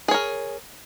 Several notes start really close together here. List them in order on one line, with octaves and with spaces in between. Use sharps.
G#4 C#5 A#4